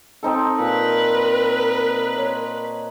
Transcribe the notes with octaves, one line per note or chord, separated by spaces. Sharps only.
C4 D#4 A4
A#2 A#4 B4
C5 C#5